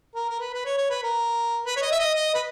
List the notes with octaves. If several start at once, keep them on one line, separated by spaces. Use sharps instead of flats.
A#4
A#4
B4
B4
C#5
C#5
B4
A#4
B4
C#5
D#5
E5
D#5
D#5
B4